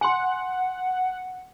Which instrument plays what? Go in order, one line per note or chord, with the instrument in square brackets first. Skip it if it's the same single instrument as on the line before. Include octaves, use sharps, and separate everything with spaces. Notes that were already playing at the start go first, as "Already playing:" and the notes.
[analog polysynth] F#5 [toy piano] G#5 C6